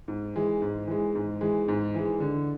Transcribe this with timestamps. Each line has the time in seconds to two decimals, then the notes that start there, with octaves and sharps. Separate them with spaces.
0.08 G#2
0.36 E3 G#3
0.62 G#2
0.88 E3 G#3
1.15 G#2
1.41 E3 G#3
1.68 G#2
1.95 E3 G#3
2.20 D3